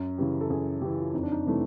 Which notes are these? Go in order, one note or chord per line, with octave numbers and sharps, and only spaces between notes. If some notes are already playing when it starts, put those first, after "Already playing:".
Already playing: F#2
C#3 E3 G4
A4
F#2 G#4
C#3 E3 G4
F4
F2 D#4
D4
D#4
C3 E3 A3